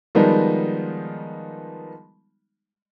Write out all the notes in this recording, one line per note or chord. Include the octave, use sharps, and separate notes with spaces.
D#3 F3 G3 G#3 B3 D#4